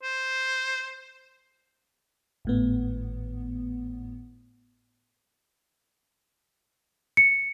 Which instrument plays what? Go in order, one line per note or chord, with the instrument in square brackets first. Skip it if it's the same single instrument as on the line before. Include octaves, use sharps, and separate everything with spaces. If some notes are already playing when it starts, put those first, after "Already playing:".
[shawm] C5
[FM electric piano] G#1 A2 B3
[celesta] C#7